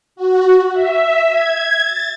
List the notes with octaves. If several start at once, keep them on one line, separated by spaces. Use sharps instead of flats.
F#4
E5
G#6
A6